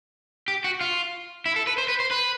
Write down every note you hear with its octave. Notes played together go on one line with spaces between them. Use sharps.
G4
F#4
F4
E4
A4
B4
C5
B4
C5
B4